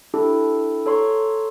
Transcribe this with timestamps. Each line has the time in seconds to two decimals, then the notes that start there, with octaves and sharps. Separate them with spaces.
0.14 D4 E4 G4 A4
0.86 A4 C#5 A#5 C6 C#6